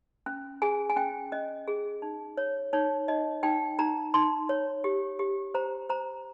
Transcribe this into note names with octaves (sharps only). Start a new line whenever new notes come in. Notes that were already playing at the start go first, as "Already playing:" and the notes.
C#4
G#4 G#5
G#5
C#4 G5
C#4 D#5
G#4
D#4
C#5
D#4 C#5
D#4 D#5
D#4 G5
D#4 A#5
D#4 C6
C#5
G4
G4
C5 A#5
C5 A#5